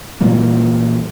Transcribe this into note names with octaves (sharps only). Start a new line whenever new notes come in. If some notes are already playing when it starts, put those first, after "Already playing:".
A#2 E3 G3 A#3